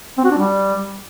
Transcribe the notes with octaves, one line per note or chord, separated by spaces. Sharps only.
C4
F#4
D4
G3